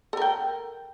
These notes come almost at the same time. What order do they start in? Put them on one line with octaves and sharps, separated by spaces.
A4 A#4 G5